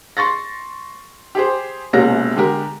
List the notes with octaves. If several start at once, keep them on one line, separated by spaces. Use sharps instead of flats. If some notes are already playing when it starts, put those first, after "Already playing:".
C6 C#6 A6 A#6
G4 G#4 C5
E1 A#1 C3 A#3 C#4 A#6
D3 G#3 G4 A#4